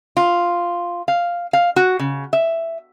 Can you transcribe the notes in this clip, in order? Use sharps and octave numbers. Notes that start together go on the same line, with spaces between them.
F4
F5
F5
F#4
C#3
E5